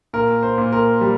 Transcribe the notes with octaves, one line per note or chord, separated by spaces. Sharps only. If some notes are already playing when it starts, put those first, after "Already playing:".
A#2 A#4
C5
A#2
A#4
G3